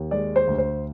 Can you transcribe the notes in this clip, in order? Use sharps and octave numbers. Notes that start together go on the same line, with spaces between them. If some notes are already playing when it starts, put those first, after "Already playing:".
Already playing: D#2
G#3 D5
C5
D2
C5